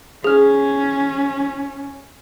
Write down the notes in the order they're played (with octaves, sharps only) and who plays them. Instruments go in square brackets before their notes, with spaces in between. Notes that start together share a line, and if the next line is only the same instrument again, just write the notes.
[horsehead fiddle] C#4 [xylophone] G#4 F6